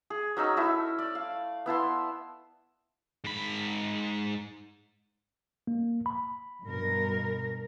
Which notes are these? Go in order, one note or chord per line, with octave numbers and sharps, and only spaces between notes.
G#4
F#3 C#4 D#4 E6
A3 E4 E6
D5
F5
B3 E4 A5 C6
G#2 B5
A#3
B5
G2 B2 A#4